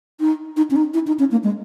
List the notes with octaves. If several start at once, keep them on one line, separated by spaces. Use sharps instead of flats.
D#4
D#4
C#4
D#4
E4
D#4
C#4
A#3
G#3